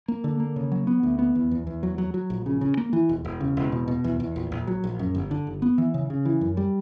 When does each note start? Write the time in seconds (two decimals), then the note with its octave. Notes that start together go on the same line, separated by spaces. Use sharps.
0.08 A#3
0.24 D3
0.40 A#3
0.56 C#3
0.72 F#3
0.87 B3
1.03 D2
1.19 B3
1.35 E2
1.51 E2
1.67 E2
1.83 F#3
1.98 F#3
2.14 F#3
2.30 A#1
2.46 C#3
2.61 C#3
2.77 A#3
2.93 E3
3.09 E1
3.25 E1
3.40 C#3
3.57 E1
3.72 B2
3.88 B2
4.04 E2
4.20 E2
4.36 A#1
4.52 A#1
4.67 F#3
4.84 A#1
4.99 F#2
5.15 G1
5.31 D3
5.47 G1
5.62 B3
5.78 E3
5.94 C#3
6.10 C#3
6.25 E3
6.41 F#2
6.57 G3